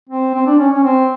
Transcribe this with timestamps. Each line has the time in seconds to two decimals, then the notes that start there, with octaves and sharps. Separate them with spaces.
0.09 C4
0.34 C4
0.47 D4
0.59 C#4
0.72 C#4
0.84 C4